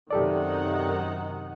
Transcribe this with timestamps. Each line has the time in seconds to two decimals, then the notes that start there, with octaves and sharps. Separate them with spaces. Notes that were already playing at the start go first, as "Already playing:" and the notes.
0.11 F#2 C3 D#3 D#4 G4 A4 D5 F#5